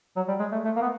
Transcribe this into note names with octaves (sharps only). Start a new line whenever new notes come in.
F#3
G3
G#3
A3
A3
A#3
B3